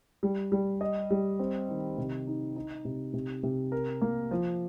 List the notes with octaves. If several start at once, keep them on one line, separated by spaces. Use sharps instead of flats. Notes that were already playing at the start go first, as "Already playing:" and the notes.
G3
G3
D#5
G3
C4
D#3
C3
D#4
D#4
C3
C3
C3
A#4
A#3
F3